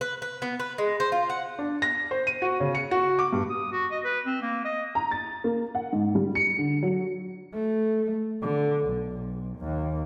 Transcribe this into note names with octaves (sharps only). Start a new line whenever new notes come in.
B4
B4
B3
B4
G#3
C5
F4
F#5
D4
A#6
C5
D#7
F#4
C#3
C#7
F#4
D6
G2
D#6
F#4
D#5
B4
C4
A#3
D#5
A#5
A6
A#3
F#5
G#2
G3
C#7
D3
F#3
A3
D3
B1
D#2